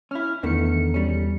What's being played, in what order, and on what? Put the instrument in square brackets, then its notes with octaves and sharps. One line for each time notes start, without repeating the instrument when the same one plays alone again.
[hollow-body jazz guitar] C#4 E4 [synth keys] F6
[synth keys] E2 C#7 [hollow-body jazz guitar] D3 D#3 A3
[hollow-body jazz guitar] G3 C#4